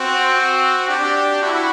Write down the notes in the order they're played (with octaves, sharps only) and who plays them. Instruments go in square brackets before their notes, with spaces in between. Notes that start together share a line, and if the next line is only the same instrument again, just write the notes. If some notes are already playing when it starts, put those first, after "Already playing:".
Already playing: [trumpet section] C4 [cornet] F#4
[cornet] F#4
[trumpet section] D4 [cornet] G4
[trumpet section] E4 [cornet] F#4